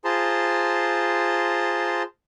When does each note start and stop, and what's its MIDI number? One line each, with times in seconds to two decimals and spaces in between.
0.05 2.03 65
0.05 2.03 68
0.05 2.03 72
0.05 2.03 81
0.05 2.03 82
0.05 2.03 84